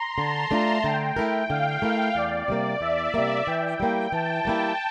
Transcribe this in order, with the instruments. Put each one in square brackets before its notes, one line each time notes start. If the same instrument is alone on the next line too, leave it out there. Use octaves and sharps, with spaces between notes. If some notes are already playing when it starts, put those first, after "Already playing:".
Already playing: [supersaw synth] A#5 C6
[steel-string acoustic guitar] D3 [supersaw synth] A5
[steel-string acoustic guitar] A3 D4 F4
[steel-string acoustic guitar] D3 [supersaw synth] G5
[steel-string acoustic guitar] A3 E4 A#4
[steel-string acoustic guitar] D3 [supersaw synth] F5
[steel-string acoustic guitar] A3 E4 A#4
[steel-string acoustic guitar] E2 [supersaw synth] D5
[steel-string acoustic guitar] C3 G3 A#3
[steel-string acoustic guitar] E2 [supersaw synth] E5
[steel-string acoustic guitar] C3 G3 A#3
[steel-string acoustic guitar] E3 [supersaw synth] G5
[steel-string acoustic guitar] G3 A#3 E4
[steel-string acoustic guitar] E3 [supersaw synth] A5
[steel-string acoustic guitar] G3 A#3 E4 [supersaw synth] G5